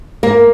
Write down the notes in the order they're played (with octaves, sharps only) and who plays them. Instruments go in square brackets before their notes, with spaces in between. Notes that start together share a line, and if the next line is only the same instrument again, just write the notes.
[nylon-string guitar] A#3